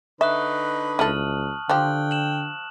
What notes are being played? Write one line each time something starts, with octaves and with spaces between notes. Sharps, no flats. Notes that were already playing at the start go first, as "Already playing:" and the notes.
D3 D#4 B4 E5 C#6 D#6 F#6
C#2 E4 A4 A5 F6 F#7
D3 F3 G4 G5 F#6
E7 F#7